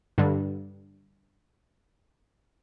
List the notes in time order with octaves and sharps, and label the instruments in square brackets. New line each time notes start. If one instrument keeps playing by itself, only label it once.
[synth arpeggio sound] G2 D3 G3